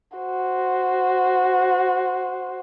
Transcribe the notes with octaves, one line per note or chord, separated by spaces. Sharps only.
F#4 C5